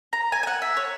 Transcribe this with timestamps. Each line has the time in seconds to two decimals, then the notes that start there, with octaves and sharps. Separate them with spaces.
0.13 A#5
0.32 G#5
0.43 G#5
0.47 F#5
0.62 E5
0.77 C#5